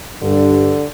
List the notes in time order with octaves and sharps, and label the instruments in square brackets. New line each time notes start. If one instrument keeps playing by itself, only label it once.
[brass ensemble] G2 [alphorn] D3